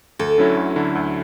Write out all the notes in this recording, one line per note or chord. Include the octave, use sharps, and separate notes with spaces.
D2 A4
D3 F#3 C#4 E4
D2
D3 F#3 C#4 E4
D2